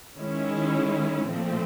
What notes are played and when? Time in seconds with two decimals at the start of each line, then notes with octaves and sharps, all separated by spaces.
0.16 D#3 G#3 C#4 E4
1.29 A#2 F3 A3 C4